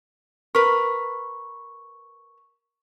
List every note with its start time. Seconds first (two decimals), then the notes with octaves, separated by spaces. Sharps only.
0.55 A#4 B4 C#6